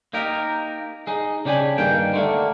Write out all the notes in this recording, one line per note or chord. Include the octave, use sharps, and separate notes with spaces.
A#3 D#4 G4 A#4
D#4 G#4
C#3 D4 G4 C#5 G#5 B5
G2 D#3 A#3 G5
D3 A3 A#3